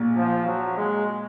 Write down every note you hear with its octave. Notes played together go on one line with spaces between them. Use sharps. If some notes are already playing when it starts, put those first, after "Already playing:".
Already playing: A#1 A#2
F3
F#3
G#3